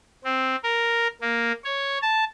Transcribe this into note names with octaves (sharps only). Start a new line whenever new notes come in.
C4
A#4
A#3
C#5
A5